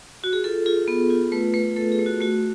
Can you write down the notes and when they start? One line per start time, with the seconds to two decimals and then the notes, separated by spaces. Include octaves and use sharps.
0.24 F#4
0.33 G#4
0.44 F4 A4
0.66 F4 G#4
0.88 B3
1.10 F4
1.32 A3 B4
1.54 A3 B4
1.76 A3 A4
1.92 G#4
1.99 A3
2.06 F#4
2.21 A3 F#4